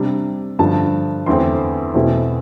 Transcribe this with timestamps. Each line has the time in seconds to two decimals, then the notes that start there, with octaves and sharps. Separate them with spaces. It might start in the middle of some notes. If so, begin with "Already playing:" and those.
Already playing: C3 G3 D4
0.59 G2 D3 F3 A5
1.26 E2 D3 A3 C4 C6
1.94 E2 B2 A3 C4 E4